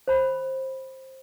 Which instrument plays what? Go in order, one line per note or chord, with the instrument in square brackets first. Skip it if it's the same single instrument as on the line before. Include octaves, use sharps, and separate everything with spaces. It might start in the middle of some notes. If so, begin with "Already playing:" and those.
[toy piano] C5 B5